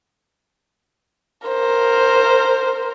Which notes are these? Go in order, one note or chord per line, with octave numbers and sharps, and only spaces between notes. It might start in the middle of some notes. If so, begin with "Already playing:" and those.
A#4 C5